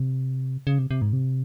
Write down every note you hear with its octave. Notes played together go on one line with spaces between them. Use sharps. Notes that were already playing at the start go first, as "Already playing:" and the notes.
Already playing: C3
C#3
C3
C3
G#2
C3